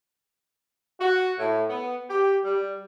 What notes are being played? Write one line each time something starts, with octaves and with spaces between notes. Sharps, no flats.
F#4
A2
B3
G4
G3